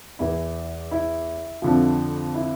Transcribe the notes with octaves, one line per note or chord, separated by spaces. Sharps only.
E2 E3 E4
E4
F2 D3 F3
E4